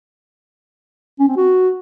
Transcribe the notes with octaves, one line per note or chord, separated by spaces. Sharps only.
C#4
C4
F#4